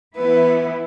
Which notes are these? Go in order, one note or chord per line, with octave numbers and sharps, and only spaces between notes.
E3 B3 E4 B4